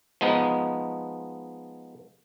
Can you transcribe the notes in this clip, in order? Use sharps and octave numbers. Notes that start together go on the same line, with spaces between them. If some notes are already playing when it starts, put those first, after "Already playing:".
F3 G#3 B3 D#4